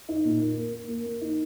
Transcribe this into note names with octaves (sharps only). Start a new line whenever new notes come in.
D#4
A#2
A#3
A#3
A#3
A#3
A#3
D#4